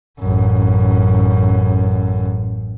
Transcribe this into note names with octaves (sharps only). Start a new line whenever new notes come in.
A1 F#2